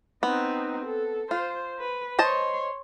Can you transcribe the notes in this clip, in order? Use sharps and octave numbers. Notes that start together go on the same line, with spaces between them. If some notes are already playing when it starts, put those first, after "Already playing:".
B3 C4 D#4
A4
F4 C5
B4
C5 C#5 D#5 A5 C6